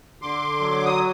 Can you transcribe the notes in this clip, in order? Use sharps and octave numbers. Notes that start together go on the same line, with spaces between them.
D3 C6 D6
F#3
D6
D#6